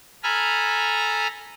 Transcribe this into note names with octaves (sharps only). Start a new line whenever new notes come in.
A4 G#5 A#5 B5 F6